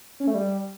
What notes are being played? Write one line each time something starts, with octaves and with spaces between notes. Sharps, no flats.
C#4
A3
G3